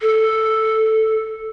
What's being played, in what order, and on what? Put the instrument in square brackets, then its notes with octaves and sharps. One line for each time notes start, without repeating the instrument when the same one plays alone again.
[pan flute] A4